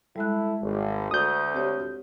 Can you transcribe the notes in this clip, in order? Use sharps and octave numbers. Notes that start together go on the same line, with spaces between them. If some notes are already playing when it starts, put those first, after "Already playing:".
G3 G#3 E4 A4 F#6
G#1
D2 D#6 G6
C4 G4 C#5